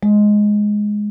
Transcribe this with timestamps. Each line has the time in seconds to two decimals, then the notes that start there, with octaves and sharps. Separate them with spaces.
0.03 G#3